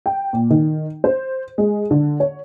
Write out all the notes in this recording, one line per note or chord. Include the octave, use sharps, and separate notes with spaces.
G5
A#2
D#3
C5
G#3
D3
C#5